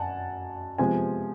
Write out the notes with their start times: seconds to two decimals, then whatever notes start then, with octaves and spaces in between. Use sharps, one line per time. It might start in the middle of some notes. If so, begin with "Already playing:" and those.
Already playing: F#2 F#5 G#5 A5
0.78 C3 F3 G#3 B3 G#5